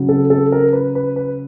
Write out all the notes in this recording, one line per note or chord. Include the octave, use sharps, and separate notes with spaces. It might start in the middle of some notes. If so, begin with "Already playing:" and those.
Already playing: C#3 F#3
A4
A4
A#4
B4
B4
B4